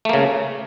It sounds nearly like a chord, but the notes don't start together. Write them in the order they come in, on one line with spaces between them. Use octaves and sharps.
A3 A#3 C#3